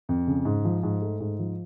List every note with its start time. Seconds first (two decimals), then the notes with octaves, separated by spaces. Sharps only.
0.09 F2
0.27 C#3
0.45 G#2
0.65 F3
0.83 G#2
1.02 A3
1.20 G#2
1.39 F3